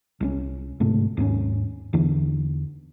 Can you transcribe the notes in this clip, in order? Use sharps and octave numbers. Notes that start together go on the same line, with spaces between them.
C2 G3 C#4
G1 G#2 C3 A3
D#2 G#2 G3 C#4
E2 D3 E3